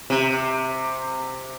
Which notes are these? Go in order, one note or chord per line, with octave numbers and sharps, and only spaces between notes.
C3